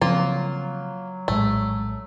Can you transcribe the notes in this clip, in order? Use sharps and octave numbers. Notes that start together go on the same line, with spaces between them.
C#3 F3 F#3 A#3 C4 F4
A#1 A2 G#3 A3